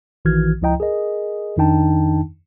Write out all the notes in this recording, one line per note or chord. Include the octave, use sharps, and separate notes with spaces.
A#1 D#3 E3 F#4 F6 G#6
C#2 F3 E4 D#5 G5 A#5
G#4 A#4 D#5
F2 D#3 D4 D#4 G5 A5